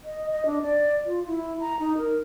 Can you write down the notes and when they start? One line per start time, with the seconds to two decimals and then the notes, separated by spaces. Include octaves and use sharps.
0.04 D#5
0.31 D#5
0.46 D4
0.63 D5
1.06 F4
1.27 E4
1.60 A#5
1.80 D#4
1.98 A#4